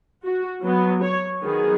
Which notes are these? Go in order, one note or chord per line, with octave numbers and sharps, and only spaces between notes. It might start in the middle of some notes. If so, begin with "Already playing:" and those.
F#4
F#3 B3
C#5
D#3 F#3 B3 G#4